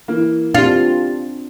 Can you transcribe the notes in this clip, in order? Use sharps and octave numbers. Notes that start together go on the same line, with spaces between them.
E3 A#3
C4 D4 F4 G4 A6